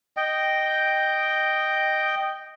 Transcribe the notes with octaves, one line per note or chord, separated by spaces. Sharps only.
D#5 G5